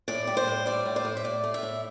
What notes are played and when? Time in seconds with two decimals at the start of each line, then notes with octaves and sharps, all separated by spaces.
0.08 A2 D5
0.27 G3
0.37 C5
0.47 A2
0.66 G3 D5
0.85 A2
0.96 C5
1.05 A2
1.17 E5
1.24 A2 D5
1.44 A3
1.54 E5
1.63 A2